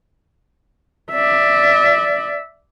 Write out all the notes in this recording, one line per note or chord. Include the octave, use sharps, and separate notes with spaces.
D5 E5